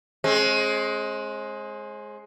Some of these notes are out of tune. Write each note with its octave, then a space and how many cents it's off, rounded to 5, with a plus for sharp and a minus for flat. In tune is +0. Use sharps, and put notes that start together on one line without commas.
G#3 +15 C4 +45